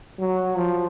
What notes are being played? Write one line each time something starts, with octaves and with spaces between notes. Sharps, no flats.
F#3
F3